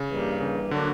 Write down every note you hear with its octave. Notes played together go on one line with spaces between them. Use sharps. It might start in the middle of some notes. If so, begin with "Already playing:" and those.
Already playing: C#3
G2 E3 G3 A#3
C#3
D3 F#3 A#3 D4 F#4